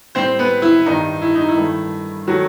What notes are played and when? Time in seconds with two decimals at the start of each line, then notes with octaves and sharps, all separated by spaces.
0.15 A2 G3 C4 C5
0.39 B3 B4
0.62 E4
0.86 G2 D#3 G3 D#4
1.22 E4
1.35 D#4
1.49 E4
1.57 G2 D#3 A3
2.27 D#3 F#3 A3 F#4